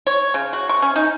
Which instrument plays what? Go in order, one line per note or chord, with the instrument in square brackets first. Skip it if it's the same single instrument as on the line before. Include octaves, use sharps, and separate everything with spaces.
[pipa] C#5
C#3
F#4
C#6
C#4
D#4